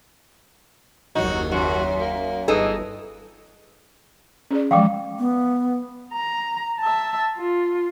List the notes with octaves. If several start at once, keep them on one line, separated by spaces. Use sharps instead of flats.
F#1 D#2 F#3 D#4 F#4
F#2 F#4
A#3
G1 E3 D#4 G#4 A4
C#4 G#4 D5
E3 F3 G#3 F5 G5 D6
B3
A#5
E5 A5
F4